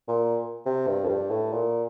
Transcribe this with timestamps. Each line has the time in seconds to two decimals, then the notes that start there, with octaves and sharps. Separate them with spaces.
0.08 A#2
0.66 C3
0.87 G2
1.04 F2
1.09 G2
1.30 A2
1.53 A#2